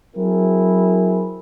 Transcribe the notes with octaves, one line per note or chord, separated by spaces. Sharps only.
F#3 C4 E4 G#4 A#4